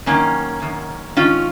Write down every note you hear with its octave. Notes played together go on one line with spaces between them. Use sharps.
F#2 D#3 A#3 C#4
F#2 D#3
G#2 D#3 C#4 F4